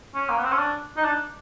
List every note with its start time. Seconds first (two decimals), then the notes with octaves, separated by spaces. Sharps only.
0.15 C#4
0.29 A#3
0.38 B3
0.44 C4
0.52 C#4
0.59 D4
0.97 D#4
1.04 D4